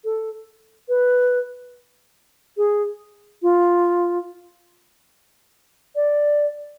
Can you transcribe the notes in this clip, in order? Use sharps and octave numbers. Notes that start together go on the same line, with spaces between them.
A4
B4
G#4
F4
D5